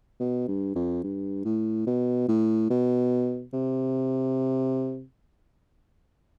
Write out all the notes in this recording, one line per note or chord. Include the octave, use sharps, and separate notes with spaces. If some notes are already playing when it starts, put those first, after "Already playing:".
B2
G2
F2
G2
A2
B2
A2
B2
C3